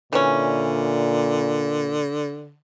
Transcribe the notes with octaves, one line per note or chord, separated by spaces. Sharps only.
A#2 D3 E3 C#4